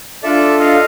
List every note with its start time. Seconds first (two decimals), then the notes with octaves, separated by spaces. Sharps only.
0.23 D4 F4 A4 D5 E5
0.60 D#5 F5